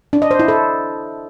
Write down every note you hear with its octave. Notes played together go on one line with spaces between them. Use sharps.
D4
D#5
C5
E4
A4